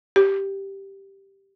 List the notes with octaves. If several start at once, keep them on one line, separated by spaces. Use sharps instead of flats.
G4